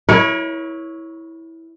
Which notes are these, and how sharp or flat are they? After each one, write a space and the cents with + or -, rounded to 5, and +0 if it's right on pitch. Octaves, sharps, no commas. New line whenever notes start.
E4 -10 A#4 +40 C#5 +0